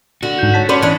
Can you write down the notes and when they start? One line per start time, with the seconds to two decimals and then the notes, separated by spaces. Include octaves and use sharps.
0.23 D3 F#4
0.39 G#2 D#4 G6
0.54 C#5 A5 B6
0.69 C#4 B4 C5 D5
0.82 E3 B3 D4